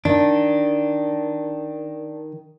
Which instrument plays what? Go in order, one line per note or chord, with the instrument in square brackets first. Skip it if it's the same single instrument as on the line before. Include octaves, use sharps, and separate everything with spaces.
[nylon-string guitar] D#3 [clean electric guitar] D4